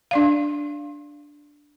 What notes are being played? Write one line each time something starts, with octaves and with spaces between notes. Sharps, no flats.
D4 D5 F5